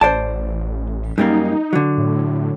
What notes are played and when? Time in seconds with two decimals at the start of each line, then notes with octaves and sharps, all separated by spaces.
0.01 A1 C5 D5 A5
1.18 F#2 G3 A#3 D#4
1.73 D3 F#3
1.98 A2